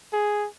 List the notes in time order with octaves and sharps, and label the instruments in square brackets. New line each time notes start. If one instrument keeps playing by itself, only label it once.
[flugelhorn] G#4